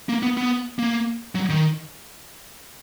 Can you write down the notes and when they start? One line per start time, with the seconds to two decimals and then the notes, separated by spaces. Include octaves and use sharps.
0.09 A#3
0.23 B3
0.37 B3
0.79 A#3
1.35 F#3
1.50 D#3